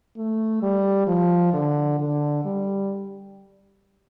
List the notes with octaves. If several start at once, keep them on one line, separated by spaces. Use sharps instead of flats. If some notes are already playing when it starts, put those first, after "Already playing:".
A3
G3
F3
D3
D3
G3